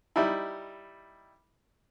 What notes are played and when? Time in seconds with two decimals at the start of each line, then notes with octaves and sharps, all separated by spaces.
0.16 G3 D#4 E4